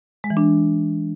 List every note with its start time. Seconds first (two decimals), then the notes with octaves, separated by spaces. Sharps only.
0.24 G#3
0.30 E3
0.37 D4